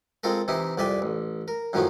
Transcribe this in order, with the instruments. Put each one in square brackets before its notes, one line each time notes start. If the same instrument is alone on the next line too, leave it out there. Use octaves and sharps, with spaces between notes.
[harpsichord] G#3 C4 F4 A4 A#4
C3 E3 D#4 E4
C2 F2 D5 E5 G5 G#5
A1
A#4
F#2 A2 D#3 F3 F#3 C#4